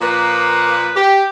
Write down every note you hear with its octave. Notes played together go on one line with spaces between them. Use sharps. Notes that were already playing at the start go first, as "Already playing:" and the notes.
A#2 F3 A#3 B4
G4